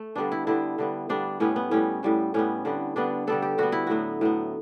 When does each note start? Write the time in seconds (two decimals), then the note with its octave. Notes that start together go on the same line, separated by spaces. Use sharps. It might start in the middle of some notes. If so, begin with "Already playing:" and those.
Already playing: A3
0.16 D3 G3 B3 D4
0.32 E4
0.47 D3 G3 B3 E4
0.78 D3 G3 B3
1.09 D3 G3 B3 D4
1.40 A2 G3 B3 C#4
1.56 B3
1.71 A2 G3 B3 C#4
2.03 A2 G3 B3
2.34 A2 G3 B3 C#4
2.65 D3 G3 B3
2.96 D3 G3 B3 D4
3.27 D3 G3 B3 A4
3.42 G4
3.58 D3 G3 B3 F#4
3.72 E4
3.87 A2 F#3 B3 F#4
4.21 A2 F#3 B3